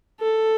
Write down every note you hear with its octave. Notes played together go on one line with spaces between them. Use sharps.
A4